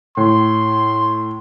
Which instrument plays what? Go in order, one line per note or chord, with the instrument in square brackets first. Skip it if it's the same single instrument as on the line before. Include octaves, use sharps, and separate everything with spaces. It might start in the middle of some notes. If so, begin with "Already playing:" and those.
[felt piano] A2 [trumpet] C6